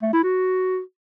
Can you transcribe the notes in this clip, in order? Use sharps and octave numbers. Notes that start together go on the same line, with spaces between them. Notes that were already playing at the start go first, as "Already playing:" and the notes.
A3
E4
F#4